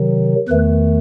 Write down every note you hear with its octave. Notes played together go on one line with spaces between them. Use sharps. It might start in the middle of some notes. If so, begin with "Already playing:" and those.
Already playing: C3 D#3 F#3
E2 D#3 A3 B4